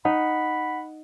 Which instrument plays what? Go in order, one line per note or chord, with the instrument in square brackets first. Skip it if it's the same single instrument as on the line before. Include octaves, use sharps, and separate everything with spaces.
[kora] D#4 [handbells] F#5 [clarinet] B5